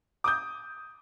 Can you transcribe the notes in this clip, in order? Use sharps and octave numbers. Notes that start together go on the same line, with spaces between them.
D6 D#6 G6